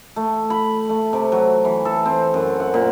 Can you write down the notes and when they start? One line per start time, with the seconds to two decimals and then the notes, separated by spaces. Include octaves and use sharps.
0.16 A3
0.50 B5
0.89 A3
1.13 C3
1.32 F#3
1.65 E3
1.85 A4
2.06 C4
2.34 F#2
2.60 F#5
2.74 A#2